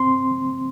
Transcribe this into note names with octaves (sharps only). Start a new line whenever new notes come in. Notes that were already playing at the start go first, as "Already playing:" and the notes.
Already playing: C4 C6